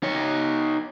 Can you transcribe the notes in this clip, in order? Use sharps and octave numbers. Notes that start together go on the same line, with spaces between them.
D#4 C#5